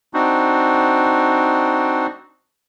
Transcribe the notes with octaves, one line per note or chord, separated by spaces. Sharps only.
C4 D4 D#4 F#4